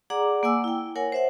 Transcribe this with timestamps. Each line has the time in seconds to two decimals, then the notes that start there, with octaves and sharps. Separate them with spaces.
0.10 G#4 D5 F#5 A#5 D6
0.43 A#3 F#5 G#5 D6 E6
0.64 E4 G5
0.96 A#4 C#5 F#5 G#5
1.12 C5 E5 F#5